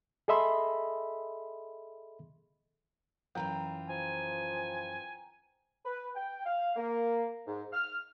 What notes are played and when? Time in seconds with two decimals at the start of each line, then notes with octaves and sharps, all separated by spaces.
0.28 G#4 A4 D#5 E5 B5 C6
3.35 F#2 E3 F4 G5 A#5
3.89 F3 G#5
5.85 B4
6.15 G5
6.45 F5
6.76 A#3
7.47 G#2
7.73 F6